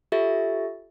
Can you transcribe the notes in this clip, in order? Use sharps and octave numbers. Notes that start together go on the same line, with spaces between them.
F4 G4 A4 E5 A6